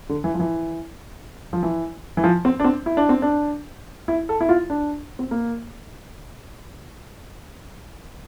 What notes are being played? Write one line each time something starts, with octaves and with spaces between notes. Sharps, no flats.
D3
E3
F3
E3
F3
E3
E3
F3
C4
D4
C4
E4
D4
C4
D4
E4
A4
E4
F4
D4
C4
A#3